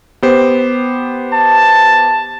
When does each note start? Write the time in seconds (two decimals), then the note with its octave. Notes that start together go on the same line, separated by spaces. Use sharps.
0.23 B3 G4 C5
1.33 A5